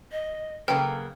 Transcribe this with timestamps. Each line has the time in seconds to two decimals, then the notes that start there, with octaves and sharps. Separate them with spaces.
0.12 D#5
0.68 C#3 F#3 A#3 A4 B4 G5